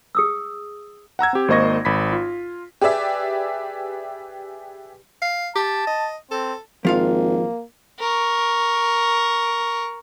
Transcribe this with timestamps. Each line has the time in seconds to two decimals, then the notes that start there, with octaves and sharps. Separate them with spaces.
0.15 G#4 D#6 E6
1.19 F#5 A#5 E6 G#6
1.33 C4 G4
1.48 G#1 A#3 C5 D#5 C#6 A#6
1.85 G#1 B5 B6
2.12 F4
2.81 G4 G#4 B4 D5 E5
5.22 F5
5.55 G4 A5
5.87 D#5
6.31 C4 A4
6.85 G#1 F3 A#3 F4 F5
8.00 A#4 C#6